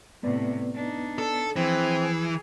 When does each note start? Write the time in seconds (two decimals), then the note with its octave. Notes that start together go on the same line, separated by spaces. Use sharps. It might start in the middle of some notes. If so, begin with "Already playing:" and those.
0.23 A2 C3 B3 B4 D5
0.75 D4 D#4
1.18 A4
1.56 E3 F3 C4 G#4